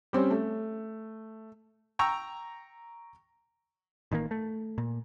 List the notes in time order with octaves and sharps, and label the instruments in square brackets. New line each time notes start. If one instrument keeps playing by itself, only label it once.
[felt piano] G3 C4 C#4 C5
A3
[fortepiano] G5 A#5 C#6 E6
[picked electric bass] A1 D#3 E3 A#3
A3
A#2